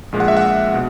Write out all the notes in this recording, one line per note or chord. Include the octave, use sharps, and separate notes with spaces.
A#1 A#2 G#3
F#5
E5
F#5
B2